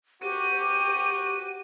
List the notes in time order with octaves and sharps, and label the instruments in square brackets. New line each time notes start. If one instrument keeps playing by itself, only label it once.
[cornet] F#4 [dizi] G4 [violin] D#7